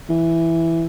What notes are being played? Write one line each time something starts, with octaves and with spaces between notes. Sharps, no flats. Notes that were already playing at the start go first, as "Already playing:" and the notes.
E3